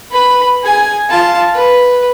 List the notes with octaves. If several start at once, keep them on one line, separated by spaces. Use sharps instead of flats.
B4 B5
G#4 G#5
F4 A5
B4